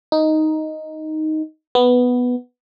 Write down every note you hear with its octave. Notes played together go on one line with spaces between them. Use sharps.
D#4
B3